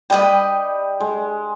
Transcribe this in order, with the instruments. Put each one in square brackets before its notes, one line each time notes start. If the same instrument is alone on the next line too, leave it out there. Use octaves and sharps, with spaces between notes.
[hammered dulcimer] G3 [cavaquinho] B4 D#5 G5
[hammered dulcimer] G#3